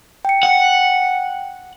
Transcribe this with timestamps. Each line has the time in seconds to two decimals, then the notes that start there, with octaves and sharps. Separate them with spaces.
0.25 G5 C#7
0.43 F#5